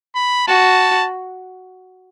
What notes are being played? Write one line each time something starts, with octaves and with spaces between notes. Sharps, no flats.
B5
F#4 A5